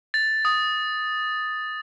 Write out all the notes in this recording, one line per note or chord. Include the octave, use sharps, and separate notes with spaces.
A6
D#6